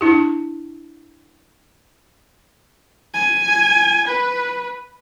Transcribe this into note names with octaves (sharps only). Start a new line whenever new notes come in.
D4 E4 G4
G#5
B4